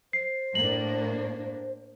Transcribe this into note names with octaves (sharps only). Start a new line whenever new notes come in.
C5 C7
A2 A#3 D4 F#7